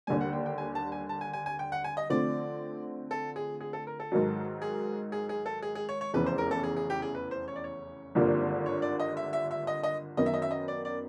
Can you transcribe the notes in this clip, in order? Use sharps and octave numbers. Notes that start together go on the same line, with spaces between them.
D#2 D3 G3 G#5
F#5
G5
G5
G#5
A5
G#5
A5
G#5
G#5
G#5
G5
F#5
G#5
D#5
D3 F3 A3 C4 D5
A4
G#4
G#4
A4
A#4
A4
G#2 D#3 F#3
G#4
G#4
G#4
A4
G#4
G#4
C#5
C#5
F1 E2 C#3 E3 B4
C5
A#4
A4
G#4
G#4
G4
G#4
B4
C5
C#5
D5
C#5
G#1 G2 D3 F3 A#3
C#5
D5
D#5
E5
E5
E5
D#5
D#5
F#2 D#3 F#3 B3 D#5
E5
D#5
E5
D#5
D5
D5